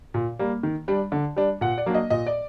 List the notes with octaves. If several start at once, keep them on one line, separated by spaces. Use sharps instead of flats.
A#2
G3 A#3
D#3
G3 D4
D3
G3 D4
A#2 F#5
D5
F#3 A#3 D4
D#5
A#2 D#5
D5